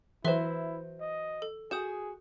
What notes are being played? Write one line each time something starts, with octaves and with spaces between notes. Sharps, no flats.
E3 F#3 E4 B4 C5 E5 C6
D#5
A4
F#4 G#4 D#6 G6 E7